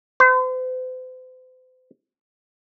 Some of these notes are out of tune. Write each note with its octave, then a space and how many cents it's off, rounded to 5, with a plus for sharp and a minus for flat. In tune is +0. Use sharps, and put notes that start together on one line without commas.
C5 -40